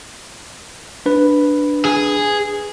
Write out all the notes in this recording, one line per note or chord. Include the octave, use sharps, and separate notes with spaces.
D4 B4
G#4